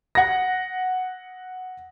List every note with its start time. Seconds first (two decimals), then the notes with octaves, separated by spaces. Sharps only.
0.15 F#5 A#6